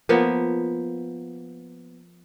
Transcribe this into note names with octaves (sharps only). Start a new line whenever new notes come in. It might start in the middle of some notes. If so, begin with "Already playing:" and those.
F3 A#3 B3